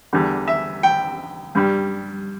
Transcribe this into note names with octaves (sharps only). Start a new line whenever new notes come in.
E2 D3 G3
E5
G5
G2 G3